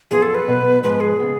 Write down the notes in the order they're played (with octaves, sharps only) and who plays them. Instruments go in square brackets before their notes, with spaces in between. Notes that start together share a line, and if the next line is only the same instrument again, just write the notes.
[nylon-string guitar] F#2 F3 B3 F4 [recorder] G#4
[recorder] A4
B4
[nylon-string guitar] B2 F#3 B3
[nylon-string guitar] G#2 F3 G#3 [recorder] B4
[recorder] G#4
[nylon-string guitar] C#3 G#3 B3